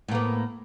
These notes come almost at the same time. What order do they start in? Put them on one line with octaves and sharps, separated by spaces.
A2 A#3 B3